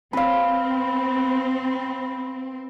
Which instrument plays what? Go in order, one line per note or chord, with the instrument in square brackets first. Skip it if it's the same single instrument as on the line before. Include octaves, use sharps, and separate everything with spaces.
[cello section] C4 [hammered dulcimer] B4 F5